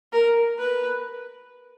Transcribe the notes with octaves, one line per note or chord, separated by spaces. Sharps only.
A#4
B4